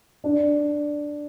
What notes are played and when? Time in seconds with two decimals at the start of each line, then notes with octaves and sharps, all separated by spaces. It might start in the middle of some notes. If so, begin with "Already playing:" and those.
0.24 D4